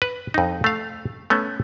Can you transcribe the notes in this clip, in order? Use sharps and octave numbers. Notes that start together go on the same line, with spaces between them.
B4
F2 D#4
A3 F5
A3 B3 C#4